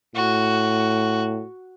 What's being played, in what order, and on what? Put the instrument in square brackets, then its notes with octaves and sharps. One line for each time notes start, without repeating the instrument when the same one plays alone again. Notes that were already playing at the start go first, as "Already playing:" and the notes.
[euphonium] A2 [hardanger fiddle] F#4